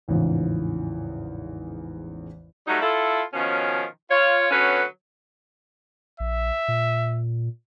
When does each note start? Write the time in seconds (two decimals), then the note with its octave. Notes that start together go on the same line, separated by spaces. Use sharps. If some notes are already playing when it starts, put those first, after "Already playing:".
0.08 A1 E2 G#2 C#3 F3
2.68 F#3 G3 A3 D#4
2.82 E4 F4 A4
3.34 B2 D#3 F3 C#4
4.11 F4 C#5
4.51 D3 F#3 B3 C#4 B4
6.20 A#1 E5
6.68 A#2